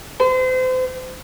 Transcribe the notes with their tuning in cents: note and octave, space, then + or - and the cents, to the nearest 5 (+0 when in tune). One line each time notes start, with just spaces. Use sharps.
C5 -35